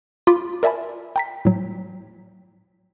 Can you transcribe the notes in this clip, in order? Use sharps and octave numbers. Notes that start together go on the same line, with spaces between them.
F4 B5 D6
A#4 D5 E5 G#5 A5 B5
G5 A#5 B6
A2 F#3